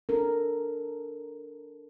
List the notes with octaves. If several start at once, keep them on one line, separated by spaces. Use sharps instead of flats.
D4 A4 A#4